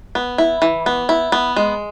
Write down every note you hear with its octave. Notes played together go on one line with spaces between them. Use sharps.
B3
E4
E3
B3
E4
B3
G#3